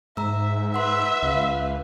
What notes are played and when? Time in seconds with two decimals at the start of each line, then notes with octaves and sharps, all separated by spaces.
0.17 G#2 E5 A#5 E6
0.74 B4 E5 F#5 C6
1.23 C#2 B4 F5